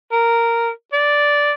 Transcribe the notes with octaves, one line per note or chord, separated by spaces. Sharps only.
A#4
D5